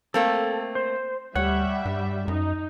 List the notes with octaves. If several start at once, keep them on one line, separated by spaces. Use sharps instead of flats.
A3 A#3 C4 A4
C5
D2 G3 C#5 E5 F#5
G2
F#2 D#4